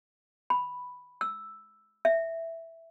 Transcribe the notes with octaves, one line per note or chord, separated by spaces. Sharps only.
B5
E6
E5